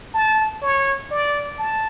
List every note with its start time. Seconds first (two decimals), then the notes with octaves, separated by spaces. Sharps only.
0.14 A5
0.62 C#5
1.11 D5
1.59 A5